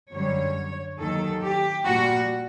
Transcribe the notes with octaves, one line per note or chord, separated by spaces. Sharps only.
F#2 D3 G3 C#5
D#2 D#3 F#3 A4
G4
A#2 G3 F#4